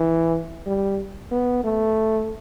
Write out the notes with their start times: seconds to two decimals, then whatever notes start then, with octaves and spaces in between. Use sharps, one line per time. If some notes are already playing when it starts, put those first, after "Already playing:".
Already playing: E3
0.67 G3
1.32 B3
1.64 A3